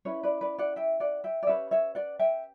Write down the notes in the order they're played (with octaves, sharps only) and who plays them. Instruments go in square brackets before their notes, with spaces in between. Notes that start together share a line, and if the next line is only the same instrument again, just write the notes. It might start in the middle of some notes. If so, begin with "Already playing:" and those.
[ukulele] C#4 E4 B4 C#5
B4 D5
B4 D5
D5 F#5
E5 G5
D5 F#5
E5 G5
D5
C#4 G4 B4 C#5 E5
C#5 E5
D5 F#5
E5 G5